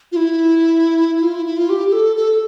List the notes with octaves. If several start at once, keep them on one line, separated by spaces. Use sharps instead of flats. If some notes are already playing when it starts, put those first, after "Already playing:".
F4
E4
E4
F4
E4
E4
F4
G4
G4
A4
A4